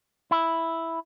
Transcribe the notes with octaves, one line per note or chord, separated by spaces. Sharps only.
E4